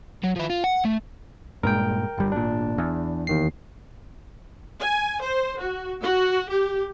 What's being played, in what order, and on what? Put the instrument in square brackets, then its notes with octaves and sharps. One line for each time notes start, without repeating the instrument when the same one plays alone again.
[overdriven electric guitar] F#3
F3 E4
F4
F#5
A3
[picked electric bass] G2 A#2 G#3 [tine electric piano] A#4 G5
[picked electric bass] G1 G3
[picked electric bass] G#1 A#2 [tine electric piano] D4
[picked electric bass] E2
[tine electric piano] D#2 D#3 C7
[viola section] G#5
C5
F#4
F#4
G4